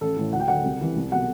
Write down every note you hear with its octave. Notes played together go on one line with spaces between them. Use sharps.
A1 A4
A2 E3
D2 F#5
G5
D3 F#3 F#5
C2
C3 E3
C2
B2 F#3 F#5